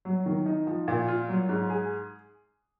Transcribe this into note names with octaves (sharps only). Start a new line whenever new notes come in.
F#3
D#3
D#4
F3
A#2
F4
F#3
G#2
G#4